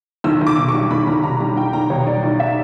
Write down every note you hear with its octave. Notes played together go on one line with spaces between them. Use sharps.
B1 E6
B1
D6
B2
C#6
G3
B1 B5
B1 A#5
B2 A#5
G3 A#5
B1 G5
B1 A#5
B2 C#5
G3 D5
B1 D5
E5